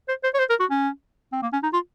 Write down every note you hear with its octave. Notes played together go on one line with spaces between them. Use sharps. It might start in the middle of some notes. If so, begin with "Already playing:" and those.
C5
C5
C#5
C5
A#4
F#4
C#4
C4
A#3
C#4
D#4
F4